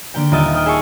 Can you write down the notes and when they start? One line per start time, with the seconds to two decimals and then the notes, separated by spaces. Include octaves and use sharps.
0.14 D3 A#3 G4 G5
0.31 D#1 F4 A#4 D#5 E5 A6
0.54 G5 D#6 F6
0.66 G#4 E5 G#5 A5 C#6